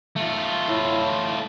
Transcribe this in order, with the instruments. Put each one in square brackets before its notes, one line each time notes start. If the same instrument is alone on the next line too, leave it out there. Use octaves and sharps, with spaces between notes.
[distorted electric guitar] A3 F4
[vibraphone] E4 C#5 B5